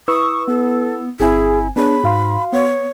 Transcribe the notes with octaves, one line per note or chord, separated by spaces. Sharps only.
E4 B4 C#6 D#6 E6
B3 A4
G1 C4 E4 G#4 G#5
B3 D4 G#4 C#5 B5
G#2 F#4 F5 C6
B3 C#5